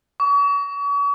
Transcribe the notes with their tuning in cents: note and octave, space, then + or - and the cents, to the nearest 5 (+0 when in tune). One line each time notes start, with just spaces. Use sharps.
C#6 +40